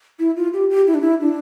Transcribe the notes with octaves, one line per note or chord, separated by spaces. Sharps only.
E4
F4
G4
G4
E4
D4
E4
D4